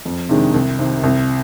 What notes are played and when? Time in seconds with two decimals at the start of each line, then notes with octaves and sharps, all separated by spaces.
0.05 F2
0.29 C3 D#3 G#3 D4
0.54 C2
0.79 C3 D#3
1.03 C2